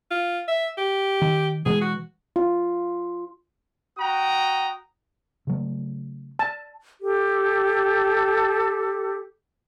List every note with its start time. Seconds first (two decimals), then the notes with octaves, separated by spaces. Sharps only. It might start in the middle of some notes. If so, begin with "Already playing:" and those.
0.11 F4
0.48 E5
0.78 G4
1.21 D#3
1.66 B2 E3 G#3 G#4
1.81 F#4
2.36 F4
3.98 F#4 G5 A#5 D#6
5.47 C#3 F#3 A3
6.39 A5
7.02 G4 A4